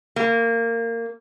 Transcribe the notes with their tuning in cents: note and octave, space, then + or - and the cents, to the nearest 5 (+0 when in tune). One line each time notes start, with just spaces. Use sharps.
A#3 -20